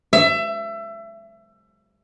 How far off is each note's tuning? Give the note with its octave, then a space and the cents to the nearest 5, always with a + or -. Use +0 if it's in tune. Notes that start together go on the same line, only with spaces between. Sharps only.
E5 +25